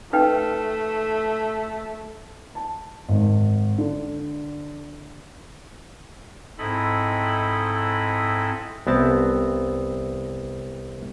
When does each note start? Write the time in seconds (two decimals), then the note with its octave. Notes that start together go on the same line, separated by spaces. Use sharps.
0.13 A3 D#4 B4 G5
2.55 A5
3.09 G#1
3.78 D3
6.58 G#2 C4 E4 A4 D#5 B5
8.87 C2 B3 C4 A5